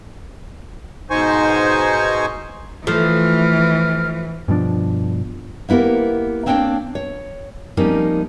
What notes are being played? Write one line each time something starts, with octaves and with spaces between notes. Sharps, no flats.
G#2 B2 D#4 C5 G#5 C#6
E3 F3 A3 F6
G2 B2 F3 D4
A#3 B3 E4 G4 A#4
A#3 C4 D4 C#5 F#5 G5
C#5
F3 G3 A#3 C4 C#4 D#4